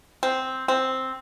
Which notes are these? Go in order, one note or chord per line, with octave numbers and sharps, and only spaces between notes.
C4
C4